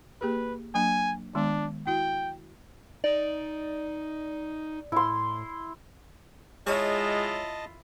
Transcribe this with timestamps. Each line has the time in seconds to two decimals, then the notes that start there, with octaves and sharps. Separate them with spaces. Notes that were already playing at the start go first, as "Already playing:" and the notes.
0.21 A#3 G4 G#4 B4
0.75 F#3 A#3 D4 G#5
1.35 D#3 G#3 B3 D4
1.87 E4 F#4 G5
3.04 D#4 D5
4.92 A2 E4 C6
6.67 G#3 E4 F4 G#4 C#5 D#5 G#5 A5